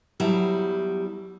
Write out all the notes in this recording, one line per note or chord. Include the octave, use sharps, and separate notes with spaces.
E2 F#3 G3 E4 A5